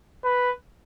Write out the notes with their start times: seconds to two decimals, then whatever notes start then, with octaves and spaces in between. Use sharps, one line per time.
0.24 B4